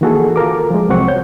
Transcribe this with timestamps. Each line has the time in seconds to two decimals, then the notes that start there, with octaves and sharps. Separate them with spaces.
0.01 D#3 E3 A#3 F#4 G#4 A4
0.36 F4 A4 A#4 D6
0.70 F3 G#3
0.89 C2 C3 F#3 C4 F#5 C#6
1.08 C#5 G6